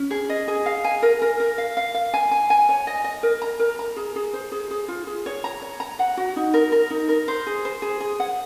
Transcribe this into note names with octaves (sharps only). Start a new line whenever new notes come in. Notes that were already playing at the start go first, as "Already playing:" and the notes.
Already playing: C#4
G#4
D#5
G#4
F5
G#5
A#4
A#4
A#4
F5
F5
F5
G#5
G#5
G#5
C#5
D#5
D#5
A#4
A#5
A#4
A#5
G#4
G#4
C5
G#4
G#4
F4
G#4
C#5
A#5
C#5
A#5
F#5
F#4
D#4
A#4
A#4
D#4
A#4
C5
G#4
C5
G#4
G#4
F#5